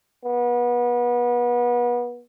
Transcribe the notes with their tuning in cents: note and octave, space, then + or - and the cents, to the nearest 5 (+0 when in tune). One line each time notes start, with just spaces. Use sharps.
B3 -30